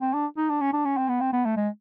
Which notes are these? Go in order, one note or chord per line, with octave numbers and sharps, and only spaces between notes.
C4
D4
D#4
D4
C#4
D4
C#4
C4
B3
C4
B3
A3
G#3